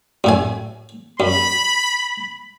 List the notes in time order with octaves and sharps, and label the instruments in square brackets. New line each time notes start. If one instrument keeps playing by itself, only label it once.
[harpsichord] F#2 A2 G#5
[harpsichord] F#2 [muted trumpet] B5